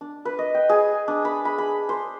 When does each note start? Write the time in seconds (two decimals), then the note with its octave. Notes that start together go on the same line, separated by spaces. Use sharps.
0.01 D4
0.25 B4
0.39 D#5
0.54 G5
0.69 G#4
1.08 D4
1.25 B5
1.45 B5
1.58 B5
1.89 C5